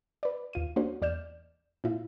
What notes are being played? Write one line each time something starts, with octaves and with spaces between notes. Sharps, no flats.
B4 D5
D#2 F4 D#7
A#3 C#4 D4 F#4 C5
E2 D5 F6 G6 E7
A#2 E4 F4